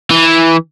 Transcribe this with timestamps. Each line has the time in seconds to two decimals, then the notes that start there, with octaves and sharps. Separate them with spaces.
0.11 E3